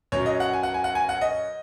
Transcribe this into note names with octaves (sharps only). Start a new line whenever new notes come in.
F#2 F#3 C#5
D#5
F#5
G#5
F#5
G#5
F#5
G#5
F#5
D#5